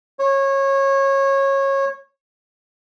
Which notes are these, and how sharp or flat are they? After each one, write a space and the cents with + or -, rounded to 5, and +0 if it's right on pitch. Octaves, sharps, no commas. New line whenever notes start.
C#5 -20